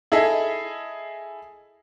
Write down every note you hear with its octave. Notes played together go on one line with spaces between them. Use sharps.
E4 G#4 A4 D#5 E5